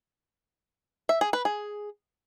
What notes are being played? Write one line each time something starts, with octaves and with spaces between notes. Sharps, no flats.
E5
G#4
B4
G#4